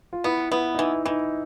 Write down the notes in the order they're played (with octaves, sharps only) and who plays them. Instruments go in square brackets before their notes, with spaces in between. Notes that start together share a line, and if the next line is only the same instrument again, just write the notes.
[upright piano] F4
[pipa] B3 [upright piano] E4
[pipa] B3 [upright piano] E4
[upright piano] D#4
[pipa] E3 [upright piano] E4
[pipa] E3 [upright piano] D#4